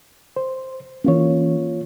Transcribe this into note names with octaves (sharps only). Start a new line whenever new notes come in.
C5
E3 A#3 C#4 F4 C#5